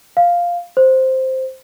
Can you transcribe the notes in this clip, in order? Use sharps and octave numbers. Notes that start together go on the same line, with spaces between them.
F5
C5